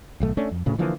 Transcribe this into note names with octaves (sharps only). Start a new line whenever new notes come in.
D1 B1 A3
A3 C#4 D4
F2
D2 A2 C#3
D3 E3 F3 A#3